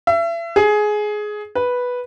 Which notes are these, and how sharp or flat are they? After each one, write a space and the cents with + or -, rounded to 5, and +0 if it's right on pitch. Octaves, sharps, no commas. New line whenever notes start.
E5 +35
G#4 +15
B4 -5